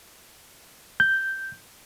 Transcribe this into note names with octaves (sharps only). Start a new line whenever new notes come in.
G6